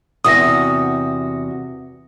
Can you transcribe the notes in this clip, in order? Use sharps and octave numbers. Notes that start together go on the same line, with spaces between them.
E2 C3 F#4 D#6 A#6